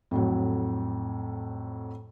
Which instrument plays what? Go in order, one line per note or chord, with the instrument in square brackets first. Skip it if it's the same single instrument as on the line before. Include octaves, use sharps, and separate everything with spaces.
[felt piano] F2 A2 F#3